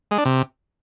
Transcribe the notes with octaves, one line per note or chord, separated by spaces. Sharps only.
G#3
D4
C3